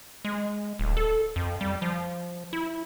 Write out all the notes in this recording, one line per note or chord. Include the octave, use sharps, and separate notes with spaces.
G#3
D1
A4
F2
G3
F3
E4